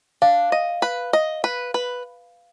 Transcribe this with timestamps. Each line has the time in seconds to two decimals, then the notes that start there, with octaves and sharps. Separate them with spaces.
0.22 D4 F5
0.52 D#5
0.82 B4
1.13 D#5
1.44 B4
1.74 B4